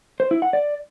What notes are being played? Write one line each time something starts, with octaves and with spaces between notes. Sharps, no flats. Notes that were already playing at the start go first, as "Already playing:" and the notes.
C5
E4
F#5
D5